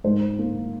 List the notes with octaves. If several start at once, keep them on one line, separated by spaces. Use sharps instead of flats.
G#2 C5
A#3